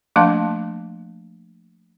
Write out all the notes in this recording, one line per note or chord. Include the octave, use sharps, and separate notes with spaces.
F3 A3 A#3 D4 F5 A5